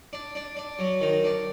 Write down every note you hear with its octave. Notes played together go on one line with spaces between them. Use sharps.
D4
D4
D4
F#3
D#3
D4